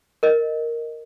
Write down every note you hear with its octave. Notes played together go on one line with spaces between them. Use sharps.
A#4 D#5